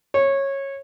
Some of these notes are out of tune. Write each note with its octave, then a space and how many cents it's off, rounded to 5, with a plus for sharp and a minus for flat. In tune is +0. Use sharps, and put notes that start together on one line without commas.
C#5 -15